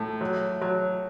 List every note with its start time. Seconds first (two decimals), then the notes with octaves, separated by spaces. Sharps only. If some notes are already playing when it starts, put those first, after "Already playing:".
Already playing: A2
0.21 F#3
0.61 F#3